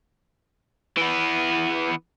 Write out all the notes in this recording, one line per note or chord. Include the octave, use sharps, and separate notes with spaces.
E3 B3